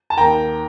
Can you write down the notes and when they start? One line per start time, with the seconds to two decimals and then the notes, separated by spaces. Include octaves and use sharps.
0.10 A5
0.17 D#2 D#3 G5 A#5